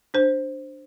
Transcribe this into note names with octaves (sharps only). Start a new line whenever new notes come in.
D4 C5